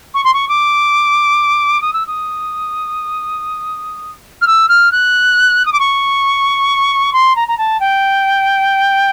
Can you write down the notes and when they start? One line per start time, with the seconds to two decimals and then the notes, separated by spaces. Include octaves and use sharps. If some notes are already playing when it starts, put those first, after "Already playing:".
0.14 C#6
0.24 C6
0.33 C#6
0.48 D6
1.81 D#6
1.93 E6
2.07 D#6
4.41 F6
4.46 E6
4.68 F6
4.91 F#6
5.65 D#6
5.72 D6
5.79 C#6
7.13 C6
7.35 A#5
7.47 A#5
7.57 A5
7.80 G5